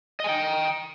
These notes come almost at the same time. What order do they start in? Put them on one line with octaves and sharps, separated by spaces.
D#5 G#5 G5